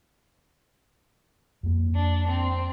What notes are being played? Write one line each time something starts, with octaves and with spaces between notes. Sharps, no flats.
F2 A#3
D4
C4